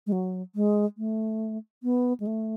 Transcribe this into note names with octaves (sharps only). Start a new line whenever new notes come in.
G#3
F#3
G#3
A3
B3
G#3
A3